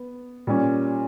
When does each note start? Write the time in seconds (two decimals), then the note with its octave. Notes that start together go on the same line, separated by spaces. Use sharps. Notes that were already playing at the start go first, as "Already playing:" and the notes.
Already playing: B3
0.47 A#2 G3 C#4